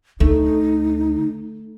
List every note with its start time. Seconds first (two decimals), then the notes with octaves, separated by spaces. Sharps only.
0.20 D2 A3 D4 D#4